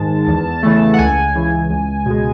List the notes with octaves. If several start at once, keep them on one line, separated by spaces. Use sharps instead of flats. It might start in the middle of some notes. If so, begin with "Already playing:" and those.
Already playing: G#2 D#3 G#3 A5
E2
C#3 E3 A3
F#5
C#2 G#5
C#3 E3
C#2
B2 G#3